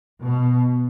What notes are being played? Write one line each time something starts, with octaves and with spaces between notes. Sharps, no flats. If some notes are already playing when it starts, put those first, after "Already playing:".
B2